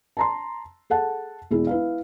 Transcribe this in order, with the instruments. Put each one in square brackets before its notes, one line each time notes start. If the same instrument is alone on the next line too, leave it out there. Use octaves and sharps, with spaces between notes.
[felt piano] A5 A#5 C6
G#4 A4 F#5 A5
E1 E4 G#4
E4 B4 F5